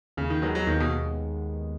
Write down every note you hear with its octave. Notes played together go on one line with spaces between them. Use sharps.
D#2 C#3
D#3
D#3 F#3 G#3 B3
F#3
D#2 D#3
B2